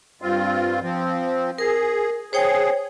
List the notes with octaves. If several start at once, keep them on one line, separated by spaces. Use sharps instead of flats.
G2 C4 F4
F3 C4
G#4 A#4
G#4 C5 C#5 G5